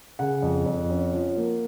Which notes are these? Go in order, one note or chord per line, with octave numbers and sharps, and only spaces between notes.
C#3 F#5
F2
F2
C#4
F3
A#3